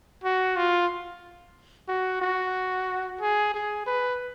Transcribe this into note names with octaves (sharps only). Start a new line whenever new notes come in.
F#4
F4
F#4
F#4
G#4
G#4
B4